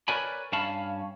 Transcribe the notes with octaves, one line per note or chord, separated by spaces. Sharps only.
A#4 B4 C#5 D5 G#5 B5
G2 C#4 F5 A5 B5